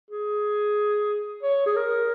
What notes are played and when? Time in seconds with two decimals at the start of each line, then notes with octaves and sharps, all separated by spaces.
0.11 G#4
1.43 C#5
1.66 G#4
1.76 A#4